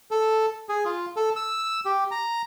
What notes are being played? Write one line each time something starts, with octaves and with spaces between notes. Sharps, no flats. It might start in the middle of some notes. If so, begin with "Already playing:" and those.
A4
G#4
F4
A4
E6
G4
A#5